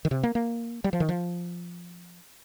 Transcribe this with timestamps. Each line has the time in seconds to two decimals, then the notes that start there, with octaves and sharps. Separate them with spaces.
0.05 D#3
0.11 C3
0.23 A#3
0.35 A#3
0.84 G3
0.93 F3
1.00 D#3
1.09 F3